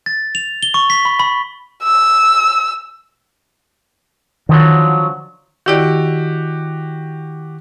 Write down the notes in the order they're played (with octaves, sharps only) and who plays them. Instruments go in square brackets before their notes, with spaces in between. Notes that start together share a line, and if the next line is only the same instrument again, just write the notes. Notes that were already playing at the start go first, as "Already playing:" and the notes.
[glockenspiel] A6
F7
G7
C#6
B6
B5
B5
[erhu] E6
[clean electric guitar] D3 F3 F#3 [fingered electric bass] D#3
[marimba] D#3 E4 D5 [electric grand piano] F#4 G4